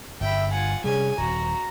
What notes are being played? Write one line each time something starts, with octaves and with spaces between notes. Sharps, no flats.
G1 G2 E5 G5 B5
F4 F#5 G#5
C3 G3 C#4 G#4 G#5
D#1 F#4 A#5